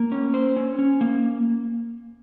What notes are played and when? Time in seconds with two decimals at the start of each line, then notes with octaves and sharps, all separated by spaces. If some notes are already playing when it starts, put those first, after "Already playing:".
Already playing: A#3
0.12 C#4
0.34 C5
0.56 C#4
0.79 C#4
1.01 A#3